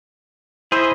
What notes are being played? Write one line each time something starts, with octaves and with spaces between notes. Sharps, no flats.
E4 G#4 C5 D#5 E5